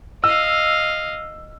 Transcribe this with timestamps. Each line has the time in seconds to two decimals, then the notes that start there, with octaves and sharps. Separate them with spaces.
0.24 D#5 F5 E6